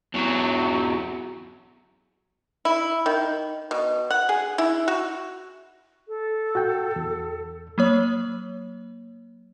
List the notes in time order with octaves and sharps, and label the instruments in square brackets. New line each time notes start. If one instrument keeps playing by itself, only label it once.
[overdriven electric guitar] E2 F#3
[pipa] E4
D#3
B2
F#5
G#4
E4
F#4
[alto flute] A4
[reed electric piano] F#4 G5
E2
[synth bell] F#3 A#3 C#5